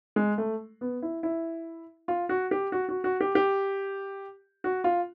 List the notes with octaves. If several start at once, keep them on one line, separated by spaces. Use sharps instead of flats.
G#3
A3
B3
E4
E4
F4
F#4
G4
F#4
F#4
F#4
G4
G4
F#4
F4